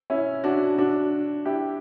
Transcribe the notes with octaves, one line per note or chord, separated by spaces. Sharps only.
C#4 E4
D4 F#4
D4 F#4
E4 G4